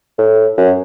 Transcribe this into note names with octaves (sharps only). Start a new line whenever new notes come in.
A2
F#2